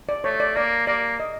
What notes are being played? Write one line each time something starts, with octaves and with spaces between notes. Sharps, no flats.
D5
A3 C#5
D5
A#3 D5
A#3 D5
D#5